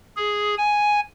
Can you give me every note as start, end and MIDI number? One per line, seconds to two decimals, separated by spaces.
0.17 0.55 68
0.57 1.00 80